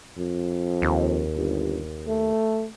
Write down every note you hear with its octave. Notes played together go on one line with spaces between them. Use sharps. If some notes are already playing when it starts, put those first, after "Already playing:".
F2
D#2
G1
A3